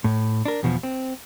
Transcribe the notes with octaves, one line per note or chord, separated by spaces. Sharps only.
A2
D4 A#4
E2 B2 D#3 F3
C4